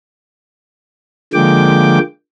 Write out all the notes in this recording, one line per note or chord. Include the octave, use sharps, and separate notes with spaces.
D3 F3 G#3 A#3 G5 D6